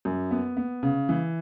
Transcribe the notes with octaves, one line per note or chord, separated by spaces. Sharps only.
F#2
B3
B3
C#3
E3